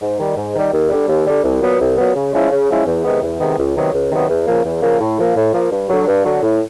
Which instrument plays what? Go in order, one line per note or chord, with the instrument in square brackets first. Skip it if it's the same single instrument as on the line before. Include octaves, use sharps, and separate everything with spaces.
[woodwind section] G#2
D#3 G3
G#2
D#3 G3
D#2
D3 G3
D#2
D3 G3
C2
A#2 F#3 B3
C2
A#2 F#3 B3
C#3
F3 G#3 C#4 E4
C#3
F3 G#3 C#4 E4
E2
C3 D#3 G#3 B3
E2
C3 D#3 G#3 B3
C#2
C3 D#3 F#3 B3
C#2
C3 D#3 F#3 B3
E2
C#3 F3 A#3
E2
C#3 F3 A#3
A2
F3 A#3
A2
F3 A#3
G2
D3 F#3
G2
D3 F#3
A2